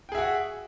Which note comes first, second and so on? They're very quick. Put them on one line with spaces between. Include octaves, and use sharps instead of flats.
G5 G#4 E5 F#4